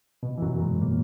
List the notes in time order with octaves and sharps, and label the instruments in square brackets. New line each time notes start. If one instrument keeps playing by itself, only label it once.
[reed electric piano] B2
E3
F#2 F#3
G#2 G#3
A#2 A#3